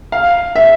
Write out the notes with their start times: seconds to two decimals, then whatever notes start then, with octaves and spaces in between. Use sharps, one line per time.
0.12 F5
0.56 E5